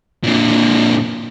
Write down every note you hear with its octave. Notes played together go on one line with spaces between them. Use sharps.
A#2 D3